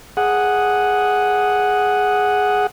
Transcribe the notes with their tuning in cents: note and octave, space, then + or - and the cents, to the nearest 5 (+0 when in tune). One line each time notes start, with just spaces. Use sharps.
G#4 +0 F#5 +0 D#6 +0